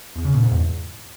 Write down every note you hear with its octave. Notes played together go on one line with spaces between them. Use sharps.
E2
C#3
A#2
G#2
E2